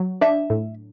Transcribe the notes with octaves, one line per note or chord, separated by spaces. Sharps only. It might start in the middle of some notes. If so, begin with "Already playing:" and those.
Already playing: F#3
D4 E5
A2